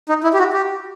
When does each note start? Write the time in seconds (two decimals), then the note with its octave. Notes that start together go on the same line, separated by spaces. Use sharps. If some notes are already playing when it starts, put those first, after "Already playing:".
0.09 D#4
0.23 E4
0.34 G4
0.39 F#4
0.53 G4